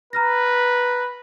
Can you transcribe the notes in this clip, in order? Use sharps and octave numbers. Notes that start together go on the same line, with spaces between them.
B4 A#5 F6 A#6